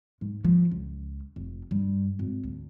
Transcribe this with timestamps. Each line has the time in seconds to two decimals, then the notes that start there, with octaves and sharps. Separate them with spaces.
0.21 G#2
0.44 F3
0.71 C#2
1.36 F1
1.71 G2
2.19 G#1
2.44 D2